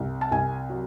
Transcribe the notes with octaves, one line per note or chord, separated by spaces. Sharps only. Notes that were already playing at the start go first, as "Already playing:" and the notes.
Already playing: C2
A5
C2 G#5
F#3